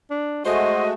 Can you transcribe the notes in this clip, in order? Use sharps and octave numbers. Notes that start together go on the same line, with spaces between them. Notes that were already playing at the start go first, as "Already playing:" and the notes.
D4
G#3 A3 F#4 C5 D#5